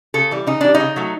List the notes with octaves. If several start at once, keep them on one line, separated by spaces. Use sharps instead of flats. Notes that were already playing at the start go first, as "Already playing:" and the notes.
C#3 A4
E3 G3
C#3 D#4
E3 G3 D4
D#4
C#3
F#3 A3